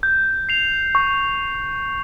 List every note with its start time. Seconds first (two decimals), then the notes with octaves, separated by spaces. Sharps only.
0.03 G6
0.49 C7 F7
0.95 C#6